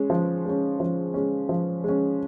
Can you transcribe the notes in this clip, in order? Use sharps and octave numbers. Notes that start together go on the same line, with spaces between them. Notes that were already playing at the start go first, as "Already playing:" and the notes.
Already playing: G#3 C#4
F3
G#3 C#4
F3
G#3 C#4
F3
G#3 C#4